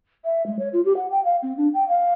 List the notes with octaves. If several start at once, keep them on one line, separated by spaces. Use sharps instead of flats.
E5
G#3
C#5
F4
G4
F#5
G5
F5
C4
D4
G5
F5